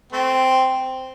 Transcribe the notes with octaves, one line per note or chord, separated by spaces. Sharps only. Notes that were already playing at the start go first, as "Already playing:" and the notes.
A3 C4